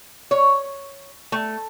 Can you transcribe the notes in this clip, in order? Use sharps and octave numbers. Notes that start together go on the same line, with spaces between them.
C#5
A3